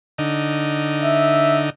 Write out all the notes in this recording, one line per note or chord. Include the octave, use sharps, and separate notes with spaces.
D3 D#4
E5